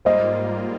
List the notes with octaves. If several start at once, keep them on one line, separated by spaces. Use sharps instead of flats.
G#2 G3 A#3 F4 C5 D#5